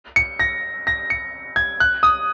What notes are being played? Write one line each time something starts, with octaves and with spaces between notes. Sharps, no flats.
C#7
A#6
A#6
C#7
G#6
F#6
D#6